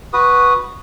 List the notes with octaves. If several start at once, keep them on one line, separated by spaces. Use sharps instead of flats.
F#4 B4 D#6